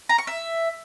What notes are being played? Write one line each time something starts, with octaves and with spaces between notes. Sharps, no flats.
A#5
C#6
E5